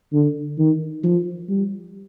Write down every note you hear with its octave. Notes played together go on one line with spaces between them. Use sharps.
D3
D#3
F3
G3